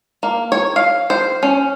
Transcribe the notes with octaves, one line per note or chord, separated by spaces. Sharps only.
A#3
C#5
F5
C5
C#4